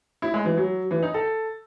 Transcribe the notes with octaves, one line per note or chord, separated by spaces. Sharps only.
E4
G#3
E3
F#3
E3
D#4
A4